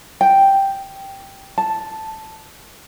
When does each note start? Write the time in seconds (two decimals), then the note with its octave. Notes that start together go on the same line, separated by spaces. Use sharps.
0.21 G5
1.58 A5